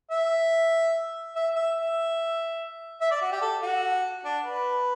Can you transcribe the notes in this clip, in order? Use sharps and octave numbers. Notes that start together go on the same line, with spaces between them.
E5
E5
E5
E5
E5
D5
F#4
G4
A4
F#4
D4
B4